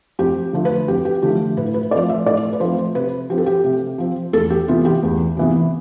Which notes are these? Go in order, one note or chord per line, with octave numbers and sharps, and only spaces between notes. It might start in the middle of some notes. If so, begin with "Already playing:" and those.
F2 G4
D3 F3 A3
B4
F2 G4
G4
D3 F3 A3 G4
A2 B4
B4
F3 A3 C4 D5
E5
A2 D5
B4
F3 A3 C4 C5
C3 B4
F3 C4 G4
A4
G4
C3
F3 C4
E2 A4
G4
C3 E3 B3 F4
G4
E2
C3 E3 B3